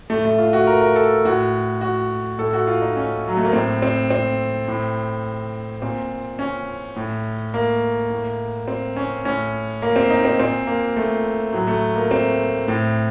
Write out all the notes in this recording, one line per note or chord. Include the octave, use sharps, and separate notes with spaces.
A2 A3
A3
F4
F#4
A#4
A#4
A4
A2 F#4
F#4
A2 A4
F#4
F4
D#4
C#4
F#3
A3
A#3
A2 C4
C4
C4
A2
A#2 C4
C#4
A2
A#3
A2
C4
C#4
A2 C#4
A#3
C4
D#4
C4
A#2 C4
A#3
A3
A2 F#3
A3
A#3
C4
A2